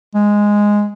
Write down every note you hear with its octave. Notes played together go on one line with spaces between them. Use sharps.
G#3